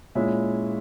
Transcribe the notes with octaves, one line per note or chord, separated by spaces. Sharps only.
A#2 G#3 C#4 E4 E5